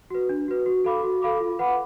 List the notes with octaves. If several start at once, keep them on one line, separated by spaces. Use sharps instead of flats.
F#4 B4
D4
F#4 B4
F#4
A4 F5 B5 D6
F#4
A4 F5 B5 D6
F4
B4 F#5 B5 D6